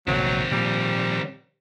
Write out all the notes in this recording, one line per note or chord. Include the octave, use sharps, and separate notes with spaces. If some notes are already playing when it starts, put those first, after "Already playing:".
F1 A#1 D#3 F#3 C4
A#2 F3 G3